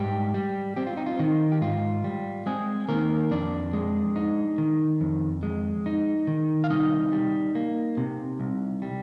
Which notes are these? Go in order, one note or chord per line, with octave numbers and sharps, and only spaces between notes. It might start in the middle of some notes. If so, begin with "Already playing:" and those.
Already playing: G#2 G3 G4
G3
C4 G4
F4
D#4
F4
D#3 D#4
G4
G#2 F4
G3
G#3 C4 G#4
D#3 A#3 A#4
F2 D4 D5
G#3
D#4
D#3
F2
G#3
D#4
D#3
F5
C2 D#4 D#5
G3
A#3
C3
C2
G3